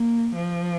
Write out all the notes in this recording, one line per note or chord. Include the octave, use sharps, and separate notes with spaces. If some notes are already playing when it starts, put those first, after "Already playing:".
Already playing: A#3
F3